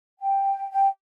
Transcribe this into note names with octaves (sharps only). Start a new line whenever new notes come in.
G5
G5